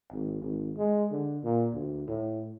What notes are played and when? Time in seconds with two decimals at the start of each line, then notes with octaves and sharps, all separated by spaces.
0.12 G#1
0.42 G#1
0.77 G#3
1.11 D3
1.44 A#2
1.74 D2
2.08 A2